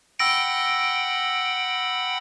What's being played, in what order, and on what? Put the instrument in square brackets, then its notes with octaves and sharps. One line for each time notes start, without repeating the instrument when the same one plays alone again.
[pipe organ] F#5 G5 B5 [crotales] E6 A#6 D7